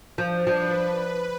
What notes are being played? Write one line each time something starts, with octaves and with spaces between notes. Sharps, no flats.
F3 D4
F3 B4
B4